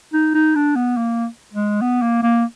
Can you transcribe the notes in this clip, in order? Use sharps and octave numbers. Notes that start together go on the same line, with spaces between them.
D#4
D#4
D4
B3
A#3
G#3
B3
A#3
A#3